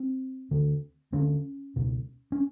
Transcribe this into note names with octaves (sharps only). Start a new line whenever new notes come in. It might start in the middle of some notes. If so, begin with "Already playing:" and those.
Already playing: C4
D2 D3
D2 D3 C#4
C#2 B2
C#4